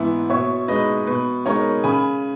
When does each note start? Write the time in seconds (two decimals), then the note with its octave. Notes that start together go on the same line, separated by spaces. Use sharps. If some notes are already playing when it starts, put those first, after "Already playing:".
Already playing: G#2 E3 B3 E4
0.30 B2 C#5 E5
0.68 G#3 D#4 B4 D#5
1.07 B2 B4
1.46 G#3 D#4 A#4 C#5
1.84 C#3 G#5 B5